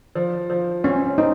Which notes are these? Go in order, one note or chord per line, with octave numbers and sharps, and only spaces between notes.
F3
F3
C4 C#4
C4 D#4